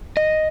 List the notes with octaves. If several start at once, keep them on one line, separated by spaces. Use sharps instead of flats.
D#5